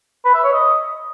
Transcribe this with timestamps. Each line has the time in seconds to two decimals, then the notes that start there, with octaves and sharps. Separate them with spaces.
0.25 B4
0.34 E5
0.44 C#5
0.53 D#5